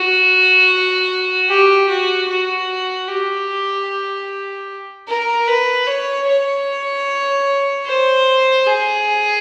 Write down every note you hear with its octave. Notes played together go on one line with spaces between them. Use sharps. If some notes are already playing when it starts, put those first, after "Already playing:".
Already playing: F#4
G4
F#4
F#4
G4
A#4
B4
C#5
C#5
C5
G#4